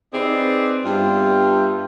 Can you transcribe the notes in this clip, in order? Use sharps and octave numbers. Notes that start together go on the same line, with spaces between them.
C4 D#4 G#4 B4 D5
G2 B3 F4 E5 G5